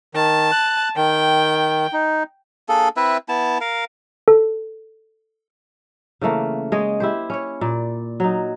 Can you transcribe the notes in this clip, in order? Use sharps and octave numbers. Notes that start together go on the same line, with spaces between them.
D#3 A5
F#6
D#3 G5
D#4
A#3 D4 G#4 A4
C4 E4 B4 E5
B3 E4 A5
A#4 F5
A4
C#3 E3 A3 A#3
G#3 C#5 D#5
E4 G4 C5
C#4 C#5
A#2 D5
F#3 D#4